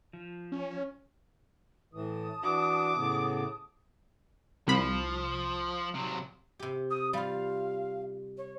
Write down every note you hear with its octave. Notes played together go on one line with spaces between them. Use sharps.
F3
C#4
A2 E3 A5 D#6
E3 D4 F#4 D6
A2 C#3 B3
C2 F3 B5
C3 F#3
C3 G4
D#6
G3 F4 F5
C#5